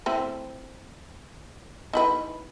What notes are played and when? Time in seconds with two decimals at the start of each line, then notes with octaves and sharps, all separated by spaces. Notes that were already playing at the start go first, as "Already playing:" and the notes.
0.06 A3 C4 E4
1.93 D#4 E4 B4